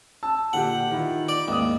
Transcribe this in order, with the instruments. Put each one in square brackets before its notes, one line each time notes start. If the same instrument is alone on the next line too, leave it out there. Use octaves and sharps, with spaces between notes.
[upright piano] A5 E6
[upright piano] A#2 D3 G4 [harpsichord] F#5
[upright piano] D#3 E4 F4
[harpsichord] D5
[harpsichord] D#2 [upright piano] G#2 D#6